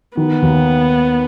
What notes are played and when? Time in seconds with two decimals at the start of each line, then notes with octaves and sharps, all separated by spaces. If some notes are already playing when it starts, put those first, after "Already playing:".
0.17 D#3 B3
0.42 D#2